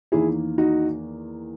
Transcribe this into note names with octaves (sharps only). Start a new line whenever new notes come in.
E2 D#3 A#3 E4 G#4
D#4 F#4